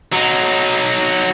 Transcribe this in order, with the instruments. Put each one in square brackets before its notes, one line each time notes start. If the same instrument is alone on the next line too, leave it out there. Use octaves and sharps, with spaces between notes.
[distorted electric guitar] F#3 D#4